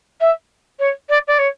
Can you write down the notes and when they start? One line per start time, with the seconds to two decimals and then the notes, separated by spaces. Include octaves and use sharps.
0.20 E5
0.79 C#5
1.09 D5
1.27 D5
1.38 C#5